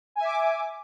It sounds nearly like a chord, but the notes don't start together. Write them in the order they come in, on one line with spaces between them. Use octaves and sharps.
G#5 E5 D6